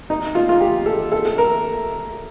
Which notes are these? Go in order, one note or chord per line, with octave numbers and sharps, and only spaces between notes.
D#4
F4
F4
G4
A4
A4
A4
A#4